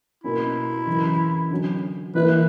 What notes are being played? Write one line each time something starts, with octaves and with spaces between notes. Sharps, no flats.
B2 A#3 C#4 E4
F#2 C#3 E3
D3 F#3 C#4
E3 A#3 E4 A#4 B4